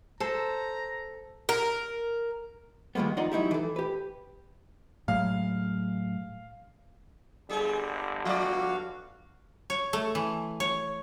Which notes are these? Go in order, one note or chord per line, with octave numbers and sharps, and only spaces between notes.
A4 C5 A#5
A#4
D#3 G3 G#3 A#3 B3
F2 D#4 D5 F#5 A#5 C6
F#3 D#4 E4 G4
E3 A4
G4 B4
A2 F#3 G#3 F5
G1 G3 G#4
F3 F#4 D5 F5
C#5
A3
E3
C#5